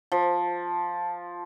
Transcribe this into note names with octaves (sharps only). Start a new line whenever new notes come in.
F3